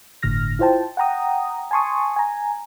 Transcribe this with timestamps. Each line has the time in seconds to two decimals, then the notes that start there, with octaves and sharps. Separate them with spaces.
0.23 G1 A2 D3 F6 A#6
0.59 E4 F4 C5 G5 A5
0.97 F#5 G5 A#5 D#6
1.71 G#5 A5 C6 C#6 D#6
2.16 G#5 A#5